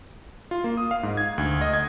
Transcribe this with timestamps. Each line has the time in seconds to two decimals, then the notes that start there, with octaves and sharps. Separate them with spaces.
0.51 F4
0.64 A#3
0.77 D#6
0.91 F5
1.03 G#2
1.17 G#6
1.38 D2
1.61 D#5
1.74 G#6